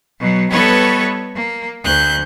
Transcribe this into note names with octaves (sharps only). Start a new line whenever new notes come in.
B2 F#3
G3 B3 A4 B4 C#5 D#5
A#3
D2 F#6 G6